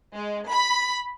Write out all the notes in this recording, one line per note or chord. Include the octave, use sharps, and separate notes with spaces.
G#3
B5